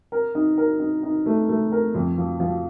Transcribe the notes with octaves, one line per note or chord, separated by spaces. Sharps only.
A#4
D#4
A#4
D#4
D#4
A3
A3
A#4
F2
F3
F3